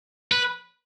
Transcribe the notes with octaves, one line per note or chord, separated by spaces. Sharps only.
B4